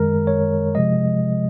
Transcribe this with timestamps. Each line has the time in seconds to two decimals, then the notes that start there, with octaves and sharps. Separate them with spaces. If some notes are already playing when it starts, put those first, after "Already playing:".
Already playing: F#2 D#3 G#3 A#4
0.27 C#5
0.75 C3 F3 G#3 D#5